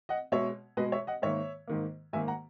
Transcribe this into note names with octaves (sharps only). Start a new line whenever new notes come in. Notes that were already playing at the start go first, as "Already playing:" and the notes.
D#5 F#5
B2 G#3 C#5 E5
B2 G#3 B4 D#5
C#5 E5
D#5 F#5
G#2 D#3 A#3 C#5 E5
G#2 D#3 A#3
G#2 D#3 A#3 E5 G#5
F#5 A#5